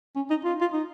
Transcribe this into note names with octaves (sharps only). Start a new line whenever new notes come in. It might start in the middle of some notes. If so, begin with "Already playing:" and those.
C#4
D#4
F4
F4
D#4